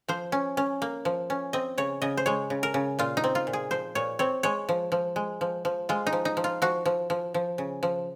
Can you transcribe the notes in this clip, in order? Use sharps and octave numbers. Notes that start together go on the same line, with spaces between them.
F3 C5
C#4
C#4
A#3
F3
C#4
C4 D#5
C#3 C#5
C#3 D#5
C5
G#3 C#5
C#3
A#4
C#3
A#2 F4
D#4
C4
F4
A#2
G#4
F3 C5
A#2 C#5
C4 C#5
G#3 C#5
F3
F3
G#3
F3
F3
G#3 F4
D#4
F3
D#4
F3
F4
F3 F#4
F3
F3
F3
C#3
F3